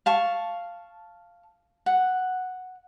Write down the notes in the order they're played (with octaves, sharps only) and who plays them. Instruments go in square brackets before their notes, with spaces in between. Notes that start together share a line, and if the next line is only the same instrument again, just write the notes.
[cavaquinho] F5 A5 C#6
F#5